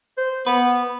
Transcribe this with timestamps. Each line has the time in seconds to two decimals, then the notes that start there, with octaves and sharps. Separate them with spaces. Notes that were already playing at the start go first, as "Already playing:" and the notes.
0.17 C5
0.47 B3 B4